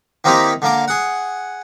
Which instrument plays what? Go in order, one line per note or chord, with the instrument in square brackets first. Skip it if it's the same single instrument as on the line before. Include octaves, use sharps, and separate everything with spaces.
[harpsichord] D#3 A#3 C4 D#4 E4 G4
D3 A#3 D6
G#4 F#5